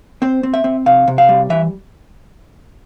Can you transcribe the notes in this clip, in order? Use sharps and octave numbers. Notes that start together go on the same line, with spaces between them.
C4 C5
C4
E5
C4
C3 F5
C3
F5
G3
E3 E5